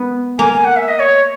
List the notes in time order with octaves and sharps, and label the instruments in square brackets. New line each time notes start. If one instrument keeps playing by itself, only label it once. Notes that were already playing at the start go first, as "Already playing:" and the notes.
Already playing: [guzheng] B3
[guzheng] A#3 [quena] G#5
[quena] G#5
F#5
E5
D#5
C#5